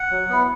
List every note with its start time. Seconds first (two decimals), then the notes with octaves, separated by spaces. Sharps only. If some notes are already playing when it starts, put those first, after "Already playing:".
Already playing: F#5
0.11 F#3
0.29 B3 E4